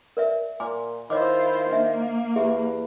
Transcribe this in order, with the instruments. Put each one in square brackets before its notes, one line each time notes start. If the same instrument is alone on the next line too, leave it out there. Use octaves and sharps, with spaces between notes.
[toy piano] A#4 D5 E5
[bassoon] A#2 [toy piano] G#5 D6
[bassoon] D#3 [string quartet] E4 F4 C5 [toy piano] C#5 D#5 D6
[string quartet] A#3 [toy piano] D4 E5
[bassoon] E2 [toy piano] G4 G#4 E5